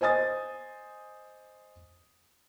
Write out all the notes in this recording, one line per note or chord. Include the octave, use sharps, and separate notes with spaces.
C5 D#5 G#5 D#6 A6